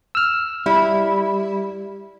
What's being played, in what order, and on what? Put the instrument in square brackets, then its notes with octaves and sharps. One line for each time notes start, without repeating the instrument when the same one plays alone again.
[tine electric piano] E6 F6
[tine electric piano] G3 [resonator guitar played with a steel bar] E4